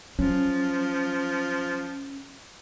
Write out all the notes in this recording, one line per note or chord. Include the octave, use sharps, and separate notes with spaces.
F3 F#3 C#4